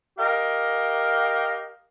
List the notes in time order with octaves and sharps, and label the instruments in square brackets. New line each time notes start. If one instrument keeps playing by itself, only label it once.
[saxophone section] G4 A#4 D#5 F5